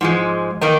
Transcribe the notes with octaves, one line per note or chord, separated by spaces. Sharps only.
G#2 F3 G#3
D#3 A#3 D#4